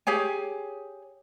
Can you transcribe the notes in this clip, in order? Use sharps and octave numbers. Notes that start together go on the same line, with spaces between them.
G4 G#4 C#5 G#5